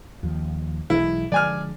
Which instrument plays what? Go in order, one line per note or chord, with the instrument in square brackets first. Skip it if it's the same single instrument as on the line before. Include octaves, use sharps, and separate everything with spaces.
[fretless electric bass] D#2 F3
[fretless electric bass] B1 E3 G#3 [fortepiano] E4
[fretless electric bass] D3 F3 G#3 [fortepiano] D5 G#5 F6